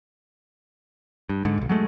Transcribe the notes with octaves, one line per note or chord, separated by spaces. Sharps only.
G2
G#2 D3
E1 B1
F#3 G#3 A3